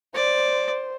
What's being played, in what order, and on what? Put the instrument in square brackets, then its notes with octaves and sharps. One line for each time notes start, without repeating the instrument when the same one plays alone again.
[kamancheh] C5 [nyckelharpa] D5